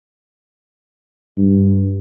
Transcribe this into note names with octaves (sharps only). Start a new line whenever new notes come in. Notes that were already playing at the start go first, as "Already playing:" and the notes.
G2